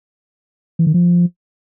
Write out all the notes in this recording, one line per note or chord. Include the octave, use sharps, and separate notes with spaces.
E3
D#3
F3